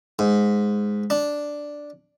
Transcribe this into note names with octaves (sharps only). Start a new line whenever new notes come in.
G#2
D4